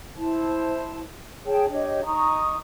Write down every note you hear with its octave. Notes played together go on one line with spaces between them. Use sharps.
E4 C5 A5
G#4 C#5 G5 A5
D4 G4 C#5 D#5
D#4 A#5 C#6 D#6